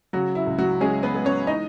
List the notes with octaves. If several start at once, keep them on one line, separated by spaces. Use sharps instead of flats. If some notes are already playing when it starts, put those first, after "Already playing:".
C#3 F#3 F#4
E4
C#2
F#3 F#4
G#3 C#4 G#4
B3 B4
G#3
C#4 C#5
E3 D#4 D#5